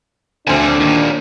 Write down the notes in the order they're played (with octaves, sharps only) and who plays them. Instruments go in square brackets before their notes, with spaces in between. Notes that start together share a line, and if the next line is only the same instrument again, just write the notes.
[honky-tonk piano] D2 C5 G#5 [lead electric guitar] D3 C4 [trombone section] D4
[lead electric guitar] D#2 A#2 [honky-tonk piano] D#3